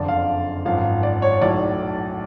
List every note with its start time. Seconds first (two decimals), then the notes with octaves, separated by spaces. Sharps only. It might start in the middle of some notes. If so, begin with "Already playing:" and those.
Already playing: F#1 F2 D3 F3 D5
0.08 F5
0.65 G#1 F#2 F3 F5
1.03 D5
1.22 C#5
1.41 B1 A2 F#3 D5